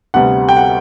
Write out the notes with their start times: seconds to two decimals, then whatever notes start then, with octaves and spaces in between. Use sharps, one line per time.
0.14 D2 C3 G3 B3 F#5
0.49 G5
0.57 F#5